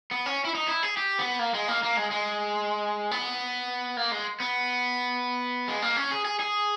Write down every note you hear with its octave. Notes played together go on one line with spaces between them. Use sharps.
B3
C#4
E4
D#4
E4
G#4
G4
B3
A#3
G#3
A#3
A#3
G#3
G#3
B3
A#3
G#3
B3
G#3
A#3
C#4
G#4
G#4
G#4